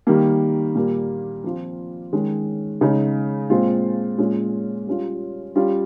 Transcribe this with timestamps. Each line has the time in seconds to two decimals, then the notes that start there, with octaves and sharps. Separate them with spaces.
0.07 D#3 G3 A#3
0.75 A#2 G3 A#3
1.44 F3 C4 F4
2.13 D#3 G#3 C#4
2.81 C#3 G#3 D#4
3.50 A#2 G#3 C4 F4
4.18 A#2 G#3 C#4 F4
4.87 G3 C#4 F4
5.56 G3 C#4 F4